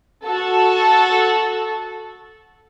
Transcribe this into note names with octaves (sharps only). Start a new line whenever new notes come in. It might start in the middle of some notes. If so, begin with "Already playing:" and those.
F#4 A4